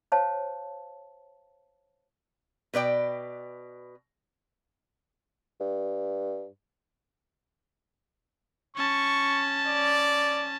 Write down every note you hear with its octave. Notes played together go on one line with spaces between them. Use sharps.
C5 C#5 F5 A5
B2 B4 D5 G5
G2
C#4 A5 C#6
D5